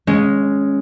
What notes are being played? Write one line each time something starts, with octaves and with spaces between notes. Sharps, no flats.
G#3 C#4